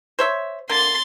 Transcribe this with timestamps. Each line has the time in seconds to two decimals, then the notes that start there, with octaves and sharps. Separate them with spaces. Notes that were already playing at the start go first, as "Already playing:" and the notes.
0.19 C5 C#5 E5
0.69 D3 A#3 C6 A6